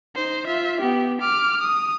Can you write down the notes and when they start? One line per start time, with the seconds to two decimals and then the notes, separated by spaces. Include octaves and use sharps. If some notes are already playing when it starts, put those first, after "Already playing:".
0.15 D#4 C5
0.46 F4 E5
0.80 B3 G4
1.21 D6 F6
1.61 D#6